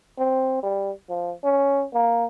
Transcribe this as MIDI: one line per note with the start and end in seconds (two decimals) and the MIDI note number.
0.18 0.59 60
0.63 0.91 55
1.09 1.32 53
1.44 1.83 61
1.94 2.25 58